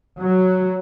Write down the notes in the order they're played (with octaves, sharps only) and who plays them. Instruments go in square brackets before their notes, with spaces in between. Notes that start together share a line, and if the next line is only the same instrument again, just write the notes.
[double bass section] F#3